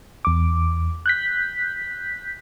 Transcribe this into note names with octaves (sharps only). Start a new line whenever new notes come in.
E2 D6
F#6 G6 B6